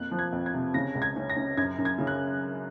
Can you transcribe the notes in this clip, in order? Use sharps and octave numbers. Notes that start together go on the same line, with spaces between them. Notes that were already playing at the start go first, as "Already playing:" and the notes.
Already playing: F2 A#3 F#6
F3
G#6
F2
G#6
C3
C#3 A#6
C#2
G#6
C#4
A#6
C#4
F#2 G#6
F#2
G#6
C#3
F#6